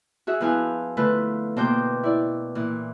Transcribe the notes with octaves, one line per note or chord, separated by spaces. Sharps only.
F#4 G#4 E5
F3 B3 E4 B4 F5 G#5
D3 A3 F4 B4
B2 A#3 C5 G5 D6 G6
E4 D5
A#2 E3